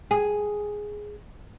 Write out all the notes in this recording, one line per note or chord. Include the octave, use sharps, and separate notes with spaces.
G#4